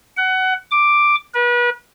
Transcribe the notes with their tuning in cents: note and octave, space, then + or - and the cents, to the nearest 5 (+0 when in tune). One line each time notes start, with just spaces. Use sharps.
F#5 +20
D6 +5
B4 -35